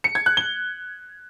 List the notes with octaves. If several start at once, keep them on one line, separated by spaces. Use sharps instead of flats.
C#7
G#6
F#6
G7